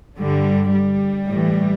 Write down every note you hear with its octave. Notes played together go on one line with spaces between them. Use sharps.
G2 D3 G3
G3
A2 E3